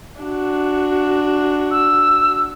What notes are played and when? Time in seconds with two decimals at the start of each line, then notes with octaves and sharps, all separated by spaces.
0.21 D4 F#4
1.71 E6